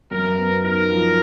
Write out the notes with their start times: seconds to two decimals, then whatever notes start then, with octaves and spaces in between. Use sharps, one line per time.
0.11 F#2 A#4
0.38 B3
0.64 D#4 A#4
0.90 F3